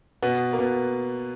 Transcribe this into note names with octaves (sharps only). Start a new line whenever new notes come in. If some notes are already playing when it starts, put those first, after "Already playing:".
B2 B3
A#3
B2 B3